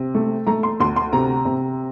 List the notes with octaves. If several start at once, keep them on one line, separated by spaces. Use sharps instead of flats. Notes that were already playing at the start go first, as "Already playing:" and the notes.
Already playing: C3
A3
A3 A#5
C6
D2 C6
C6
C3 A#5
C3